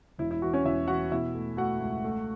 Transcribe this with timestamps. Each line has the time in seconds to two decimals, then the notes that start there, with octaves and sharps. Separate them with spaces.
0.18 E1 E4
0.31 E4
0.42 E3 F#4
0.54 C#4 C#5
0.65 E1 E4 E5
0.88 E3 F#4 F#5
1.12 B2 E4 E5
1.34 A3
1.57 A3 F#4 F#5
1.80 C#2
2.04 A3